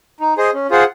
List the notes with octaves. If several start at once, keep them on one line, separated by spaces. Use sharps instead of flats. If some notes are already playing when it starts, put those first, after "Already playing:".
D#4
G#4 C5 D#5
C#4
F4 G#4 C5 F#5